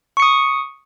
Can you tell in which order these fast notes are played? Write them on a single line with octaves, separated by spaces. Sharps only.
C#6 C#7 D#6